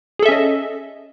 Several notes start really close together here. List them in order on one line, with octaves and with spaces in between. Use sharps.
G#4 A4 E5 C#4 D#5